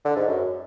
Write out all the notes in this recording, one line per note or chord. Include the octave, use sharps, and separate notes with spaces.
D3
G#2
F#2